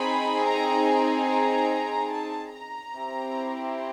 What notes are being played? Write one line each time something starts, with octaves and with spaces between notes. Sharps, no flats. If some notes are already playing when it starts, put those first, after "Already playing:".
Already playing: C4 D#4 G#4 B5
A#5
A#5
A#5
A5
A#5
C4 E4 G4